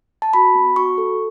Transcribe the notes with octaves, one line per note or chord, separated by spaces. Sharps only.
A5
F#4 B5
B3
F#4 C#6
A4